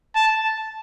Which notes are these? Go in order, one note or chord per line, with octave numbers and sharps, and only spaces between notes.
A5